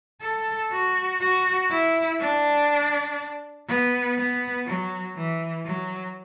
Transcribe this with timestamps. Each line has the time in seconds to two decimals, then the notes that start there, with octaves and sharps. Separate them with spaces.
0.22 A4
0.72 F#4
1.21 F#4
1.70 E4
2.20 D4
3.68 B3
4.17 B3
4.66 F#3
5.16 E3
5.65 F#3